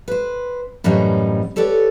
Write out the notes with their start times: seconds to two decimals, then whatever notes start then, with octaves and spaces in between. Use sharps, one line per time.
0.08 B4 C5
0.84 F#2 A2 E3 G3 C#4 D#4
1.56 G4 A4 B4 C#5 D5